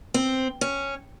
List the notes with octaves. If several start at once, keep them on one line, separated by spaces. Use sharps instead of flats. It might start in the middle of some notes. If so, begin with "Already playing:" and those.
C4
C#4